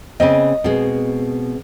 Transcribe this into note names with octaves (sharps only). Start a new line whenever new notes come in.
C#3 B3 C4 D#5
B2 G#3 C4 G#4 B4